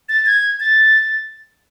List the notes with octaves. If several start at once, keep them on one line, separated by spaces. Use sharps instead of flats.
A6
G#6
A6